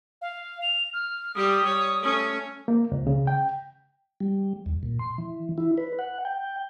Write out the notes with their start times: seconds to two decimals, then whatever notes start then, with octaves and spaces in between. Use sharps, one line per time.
0.21 F5
0.62 F7
0.93 F6
1.35 G3 G4 D#6
1.64 G3 C#5
2.00 A3 C#4
2.68 A#3
2.92 C#2
3.07 C#3
3.27 G5
4.20 G3
4.66 D#2
4.83 A#2
4.99 C6
5.18 E3
5.58 E4
5.78 B4
5.99 F#5
6.25 G5